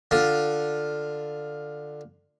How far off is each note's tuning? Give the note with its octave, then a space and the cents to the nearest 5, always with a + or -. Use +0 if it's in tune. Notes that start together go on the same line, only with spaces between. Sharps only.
D3 +10 F4 +10